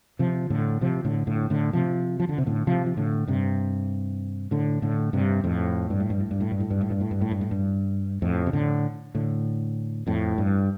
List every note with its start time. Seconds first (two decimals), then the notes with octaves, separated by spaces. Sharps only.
0.19 C3 F3
0.50 A2 D3
0.81 C3 F3
1.05 A2 D3
1.27 A2 D3
1.50 A2 D3
1.73 C3 F3
2.20 F3
2.29 D3
2.38 C3
2.46 A2 D3
2.67 C3 F3
2.86 F3
2.97 A2 D3
3.28 G2 C3
4.51 A2 D3
4.82 A2 D3
5.13 G2 C3
5.44 F2 A2
5.90 G2
6.00 A2
6.10 G2
6.20 A2
6.31 G2
6.41 A2
6.51 G2
6.60 A2
6.70 G2
6.81 A2
6.90 G2
7.01 A2
7.11 G2
7.21 A2
7.31 G2
7.41 A2
7.51 G2
8.22 F2 A2
8.46 C3
8.53 A2 D3
9.15 A2 D3
10.07 F2 A2
10.38 G2